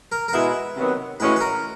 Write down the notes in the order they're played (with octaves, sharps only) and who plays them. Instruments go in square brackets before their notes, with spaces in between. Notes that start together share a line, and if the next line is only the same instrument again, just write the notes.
[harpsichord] A#4
A#4
[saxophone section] B2 G#3 B3 E4 G#4 [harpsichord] B4
[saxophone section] C3 D#3 F#3 B3
[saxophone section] A2 E3 G#3 C#4 F#4 [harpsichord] B4
[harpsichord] B4
A#4